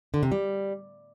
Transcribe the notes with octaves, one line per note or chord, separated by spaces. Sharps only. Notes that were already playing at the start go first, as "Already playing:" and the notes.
D3
C3
G3